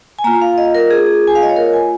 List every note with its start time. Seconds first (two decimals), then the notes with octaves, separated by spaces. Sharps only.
0.19 G#5
0.24 A#3 F4 A#5
0.42 F5
0.58 D#5
0.75 A#4
0.91 G#4
1.27 G#5
1.35 F5
1.43 D#5
1.49 C#5
1.57 A#4
1.73 G#5